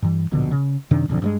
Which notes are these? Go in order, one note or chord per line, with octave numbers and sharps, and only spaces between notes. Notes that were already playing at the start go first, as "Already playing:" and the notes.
G2 E3
D1 A#1 B2 D3
C#3
F#2 C3 D#3 D4
D#1 B1 F2 D3
G2 F#3 G#3